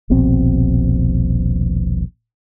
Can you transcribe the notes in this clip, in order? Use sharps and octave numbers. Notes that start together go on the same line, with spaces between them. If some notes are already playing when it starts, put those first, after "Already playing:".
D#1 A#1 B2 C4